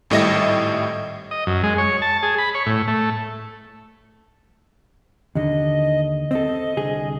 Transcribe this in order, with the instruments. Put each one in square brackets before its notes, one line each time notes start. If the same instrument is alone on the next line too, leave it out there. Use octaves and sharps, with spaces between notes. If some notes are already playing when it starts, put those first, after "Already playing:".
[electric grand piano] G#1 A2 G3 D#5 E5 A#6
[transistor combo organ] D#5
F#2
G#3
C#5
A5
G#4
B5
C#5
A2
A3
[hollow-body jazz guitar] D#2 D3 [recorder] D#5
[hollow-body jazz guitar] C4 A4 [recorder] D#5
[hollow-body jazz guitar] C2 D3 G#4